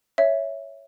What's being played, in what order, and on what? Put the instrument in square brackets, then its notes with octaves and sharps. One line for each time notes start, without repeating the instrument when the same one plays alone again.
[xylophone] C#5 E5